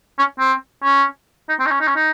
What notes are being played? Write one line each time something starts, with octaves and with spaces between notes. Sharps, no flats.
C#4
C4
C#4
D#4
C4
D#4
C#4
D#4
C#4
D#4